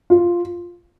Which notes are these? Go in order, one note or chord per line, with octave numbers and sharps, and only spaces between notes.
F4